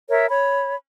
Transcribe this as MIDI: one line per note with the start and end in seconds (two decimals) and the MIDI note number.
0.10 0.26 70
0.10 0.26 73
0.10 0.26 76
0.30 0.75 73
0.30 0.75 83